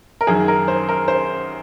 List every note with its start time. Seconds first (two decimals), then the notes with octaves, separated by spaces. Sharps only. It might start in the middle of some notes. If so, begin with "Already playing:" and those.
0.21 A#4
0.27 F#2 D#3 G#4
0.48 A#4
0.68 C5
0.89 A#4
1.08 C5